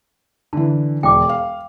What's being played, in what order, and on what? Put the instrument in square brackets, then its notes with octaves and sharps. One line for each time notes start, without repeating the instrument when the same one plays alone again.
[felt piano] D3 E3 [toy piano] A5
[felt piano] E1 [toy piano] G5 D6
[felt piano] F5